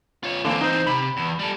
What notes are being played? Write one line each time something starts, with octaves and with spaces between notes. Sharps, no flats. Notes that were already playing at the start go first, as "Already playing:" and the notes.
F4 C#5
D3 E3 A#3 C4
D#4 C5
C3 B5
E2
G3 A4